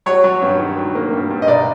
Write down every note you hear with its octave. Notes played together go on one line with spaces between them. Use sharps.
F#3 C#5
F#3
G2
D#3
F#3
A#3
G2
G2
D#5
B1 D5